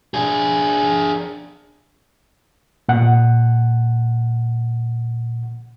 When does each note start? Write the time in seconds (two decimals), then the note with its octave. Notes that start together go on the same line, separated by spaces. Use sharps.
0.14 D4 G#4
2.89 A#2 F#5